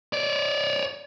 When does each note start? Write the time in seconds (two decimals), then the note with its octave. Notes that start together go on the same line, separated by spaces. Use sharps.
0.13 C#5 D5